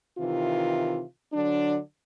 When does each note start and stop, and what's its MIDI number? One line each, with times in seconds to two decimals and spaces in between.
0.19 1.02 48
0.19 1.02 51
0.19 1.02 52
0.19 1.02 65
1.33 1.79 50
1.33 1.79 54
1.33 1.79 62